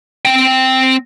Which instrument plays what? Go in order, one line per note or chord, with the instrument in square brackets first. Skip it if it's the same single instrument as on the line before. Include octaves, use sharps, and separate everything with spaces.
[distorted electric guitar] C4 G5